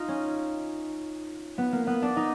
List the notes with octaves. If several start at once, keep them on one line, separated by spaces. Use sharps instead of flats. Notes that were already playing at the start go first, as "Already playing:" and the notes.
Already playing: D#4 F4
C#4
B3
A#3
B3
D4
D#4